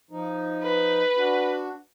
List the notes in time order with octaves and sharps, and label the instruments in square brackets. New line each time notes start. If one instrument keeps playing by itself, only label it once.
[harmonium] F3 D#4
[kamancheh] B4
[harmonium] D4 F#4